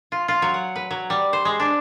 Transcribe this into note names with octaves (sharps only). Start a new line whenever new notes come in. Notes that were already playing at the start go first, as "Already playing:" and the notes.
F4
F4
F#3
F#5
B4
F#3
G3
C5
G#3
D4